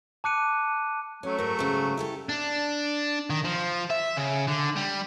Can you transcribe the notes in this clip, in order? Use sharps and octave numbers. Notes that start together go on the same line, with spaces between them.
A5 D6 F#6 C#7 D#7
F#3 A3 C#4
G#2 A#4
G#2 C#3
E4 G4 A4
D4
D#3
F3
E5
C#3
D3
G3